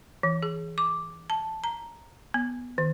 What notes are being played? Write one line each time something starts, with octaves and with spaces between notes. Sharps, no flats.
E3
G#4
D6
A5
A#5
B3
D#3